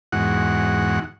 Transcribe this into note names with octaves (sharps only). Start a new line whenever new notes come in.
E2 G#2 F#4 F#5